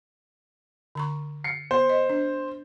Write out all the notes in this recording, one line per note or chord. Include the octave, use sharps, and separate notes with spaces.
D3 A#5 C#6
C7 C#7
B3 C5
D#5
D4